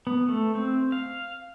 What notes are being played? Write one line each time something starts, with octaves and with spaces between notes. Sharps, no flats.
B3
A3
C4
F5